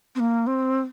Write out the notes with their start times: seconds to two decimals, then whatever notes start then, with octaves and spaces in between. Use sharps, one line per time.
0.15 C4
0.20 A#3
0.47 C4